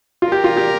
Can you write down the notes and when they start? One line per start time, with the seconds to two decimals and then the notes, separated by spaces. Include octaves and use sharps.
0.22 F4
0.32 G4 A#4
0.44 F4
0.57 G4